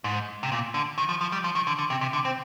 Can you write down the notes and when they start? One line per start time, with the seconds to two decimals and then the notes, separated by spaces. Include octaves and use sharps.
0.04 G#2
0.43 C3
0.52 A#2
0.74 D3
0.98 D#3
1.09 F3
1.21 F3
1.32 G3
1.44 F3
1.55 D#3
1.67 D3
1.78 D3
1.90 C3
2.01 C3
2.13 D3
2.25 C4